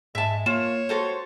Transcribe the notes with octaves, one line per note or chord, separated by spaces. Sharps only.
G#2 G#3 E5 A5
A#3 F4 C#5 E7
F#4 A4 C5 C6